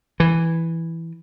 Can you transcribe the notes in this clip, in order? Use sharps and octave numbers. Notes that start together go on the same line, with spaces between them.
E3